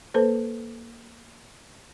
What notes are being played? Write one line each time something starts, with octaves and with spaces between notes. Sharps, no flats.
A#3 A4 B4 C5